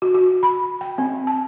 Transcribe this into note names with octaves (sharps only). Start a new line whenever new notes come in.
F#4
F#4
B5
G5
C4
A5